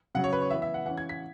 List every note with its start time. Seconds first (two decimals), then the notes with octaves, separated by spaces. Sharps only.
0.15 C#3 F#3 C#4 F#5
0.24 C#5
0.33 B4
0.42 C#5
0.50 E3 E5
0.54 B3
0.62 E5
0.74 F#5
0.86 E3 C#4 F#5
0.97 G#6
1.09 B6